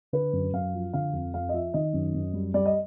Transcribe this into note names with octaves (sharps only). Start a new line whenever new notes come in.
D3 B4
F#2
F#2 F5
F3
D3 F5
F2
F2 F5
D#5
F3 E5
D#3 D#5
F#2
F#2
G3
G3 D5
D#5